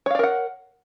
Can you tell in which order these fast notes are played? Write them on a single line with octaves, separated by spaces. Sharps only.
C#5 F5 D5 A#4 F#5